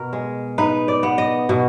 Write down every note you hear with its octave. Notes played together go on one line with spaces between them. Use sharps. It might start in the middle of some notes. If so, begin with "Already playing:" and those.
Already playing: B2 A#4
G#3
D#4 B4
D5
B3
D#5
B2